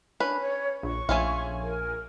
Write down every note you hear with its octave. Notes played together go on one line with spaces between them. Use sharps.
C#4 D4 B4
C#5
A#1 C#6
A#1 A3 C#4 F4 G#5
A#4